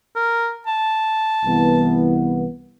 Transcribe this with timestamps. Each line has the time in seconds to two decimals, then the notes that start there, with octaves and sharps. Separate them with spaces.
0.16 A#4
0.67 A5
1.45 C2 E3 B3